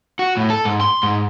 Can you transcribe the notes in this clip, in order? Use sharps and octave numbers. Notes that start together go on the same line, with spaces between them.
F#4
A2
A4
G#2
C6
G#2